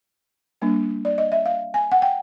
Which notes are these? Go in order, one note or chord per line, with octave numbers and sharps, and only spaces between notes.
G3 A#3 D4
D5
D#5
E5
F5
G#5
F#5
G5